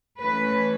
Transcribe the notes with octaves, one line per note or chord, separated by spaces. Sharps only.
E3 A3 C#4 B4